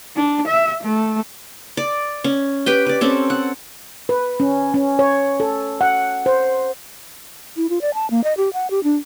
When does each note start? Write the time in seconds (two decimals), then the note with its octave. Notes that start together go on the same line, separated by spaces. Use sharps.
0.16 D4
0.48 E5
0.84 A3
1.77 D5
2.24 C#4
2.66 G4 B4 G5
2.86 B4 D5
3.01 C4 C#4 A4
3.30 F#5
4.09 B4
4.40 C#4
4.74 C#4
4.99 C#5
5.40 A4
5.81 F#5
6.26 C5
7.57 E4
7.70 F4
7.81 D5
7.94 A5
8.11 A#3
8.24 D#5
8.37 G4
8.53 F#5
8.70 G4
8.84 D4